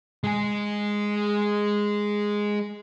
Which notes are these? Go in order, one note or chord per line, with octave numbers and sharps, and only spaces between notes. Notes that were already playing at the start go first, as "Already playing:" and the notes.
G#3 G#4